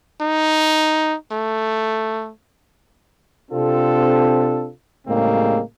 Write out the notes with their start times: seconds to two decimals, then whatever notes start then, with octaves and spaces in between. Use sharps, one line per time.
0.21 D#4
1.32 A3
3.51 C3 C4 D4 F4 A4
5.07 A2 C#3 G3 G#3 A#3 C4